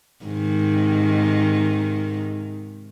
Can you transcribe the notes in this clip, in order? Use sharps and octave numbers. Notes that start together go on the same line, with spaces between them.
G#2 C3 D#3